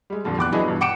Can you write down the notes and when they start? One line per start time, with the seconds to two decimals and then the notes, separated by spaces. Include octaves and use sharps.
0.10 G3 G#3
0.24 F2 A#2 D3 F3 G3
0.37 E2 G5 D6 F#6
0.52 E3 F#3 D4 E4 G#4 D#5
0.64 G2 B2
0.81 F#5 G5 D6 C#7 D7 E7